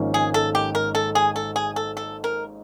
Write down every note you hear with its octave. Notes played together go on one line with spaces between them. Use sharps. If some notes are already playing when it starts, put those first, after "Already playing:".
Already playing: G#1 G#2 F3 A#3 C#4
G#4
A4
G4
A#4
A4
G#4
A4
G#4
A4
A4
A#4